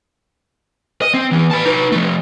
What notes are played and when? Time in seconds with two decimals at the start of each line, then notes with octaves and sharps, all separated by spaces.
1.02 D#5
1.14 C4
1.31 E3 B3
1.51 B4 A5
1.66 D#4 B4
1.92 F3 A3